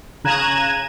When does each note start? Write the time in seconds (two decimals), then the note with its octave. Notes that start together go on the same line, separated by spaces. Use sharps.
0.24 C#3 A#5 F#6 G#6 D#7 E7